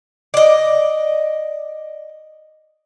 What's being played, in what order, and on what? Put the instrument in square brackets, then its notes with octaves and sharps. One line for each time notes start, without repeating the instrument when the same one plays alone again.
[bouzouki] D5 D#5